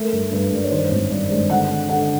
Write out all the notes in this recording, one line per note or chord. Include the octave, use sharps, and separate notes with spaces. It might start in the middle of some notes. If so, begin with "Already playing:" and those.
Already playing: A3 A#4
G2
G2 B4
G2 D5
C#5
D#3 C5
G#1
G2 D5
G#3
D3 F#5
D3
D3 F#5